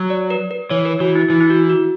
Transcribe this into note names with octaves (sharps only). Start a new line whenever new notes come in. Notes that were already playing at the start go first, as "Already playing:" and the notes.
Already playing: F#3
D5
B4
B4
E3 C#5
B4
E3 F#4
E4
E3 E4
E4
F#4
F#4